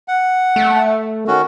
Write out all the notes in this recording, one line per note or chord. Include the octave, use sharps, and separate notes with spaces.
F#5
A3
D#3 C#4 F#4